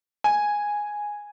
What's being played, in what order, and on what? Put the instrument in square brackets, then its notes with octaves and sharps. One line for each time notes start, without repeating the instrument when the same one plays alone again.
[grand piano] G#5